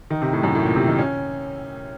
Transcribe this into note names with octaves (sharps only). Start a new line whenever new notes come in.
D#3
C3
A2
F#2
A2
A#2
C3
D#3
C#4